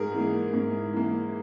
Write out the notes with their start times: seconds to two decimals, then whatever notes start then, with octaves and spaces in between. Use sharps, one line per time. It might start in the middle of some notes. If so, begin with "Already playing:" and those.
Already playing: G#2 G#4 A#4
0.14 E3 A#3
0.53 G#2
0.93 E3 A#3